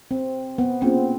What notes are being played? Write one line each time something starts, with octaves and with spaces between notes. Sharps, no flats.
C4
B3
A#3 C4 C#4 F4 G#4